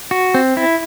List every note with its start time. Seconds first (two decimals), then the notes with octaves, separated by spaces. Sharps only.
0.11 F#4
0.34 C4
0.57 E4